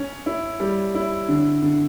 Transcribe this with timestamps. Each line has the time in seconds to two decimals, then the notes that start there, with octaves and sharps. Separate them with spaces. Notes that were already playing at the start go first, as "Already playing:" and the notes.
Already playing: C#4
0.26 E4
0.60 G3
0.95 E4
1.28 D3
1.62 D3